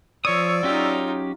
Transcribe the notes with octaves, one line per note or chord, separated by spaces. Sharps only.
F3 C#5 D5 D#6 E6
F#3 C#4 D#4 F4 G4